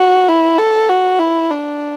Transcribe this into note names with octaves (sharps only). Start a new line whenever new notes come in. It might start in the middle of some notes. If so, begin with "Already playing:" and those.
Already playing: F#4
E4
A4
F#4
E4
D4